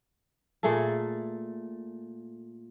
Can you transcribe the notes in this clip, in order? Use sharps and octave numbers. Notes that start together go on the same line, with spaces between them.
A#2 A3 G#4 A4